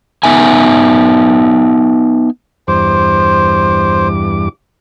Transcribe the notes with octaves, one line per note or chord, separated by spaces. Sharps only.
B3 D#4 E5 G#5
E2 G2 C5 D6